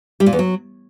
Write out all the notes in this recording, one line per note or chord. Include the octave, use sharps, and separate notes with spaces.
G3
A#2
E2
F#3